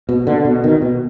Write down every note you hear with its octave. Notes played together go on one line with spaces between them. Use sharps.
B2
B2 D3
B2
B2 D#3
B2